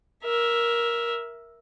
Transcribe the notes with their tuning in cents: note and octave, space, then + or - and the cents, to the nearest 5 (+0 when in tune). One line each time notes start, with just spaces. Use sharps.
A#4 +10 E5 +0